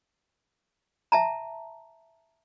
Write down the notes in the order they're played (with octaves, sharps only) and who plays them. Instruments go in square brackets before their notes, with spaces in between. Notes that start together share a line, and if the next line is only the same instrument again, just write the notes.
[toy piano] E5 A5 A#5